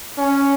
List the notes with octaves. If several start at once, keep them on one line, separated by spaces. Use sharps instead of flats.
C#4